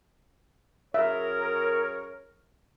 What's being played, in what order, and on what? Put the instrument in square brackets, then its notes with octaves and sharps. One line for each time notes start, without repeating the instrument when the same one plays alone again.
[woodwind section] F#2 G#4 A#4 [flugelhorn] C#5 [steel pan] E5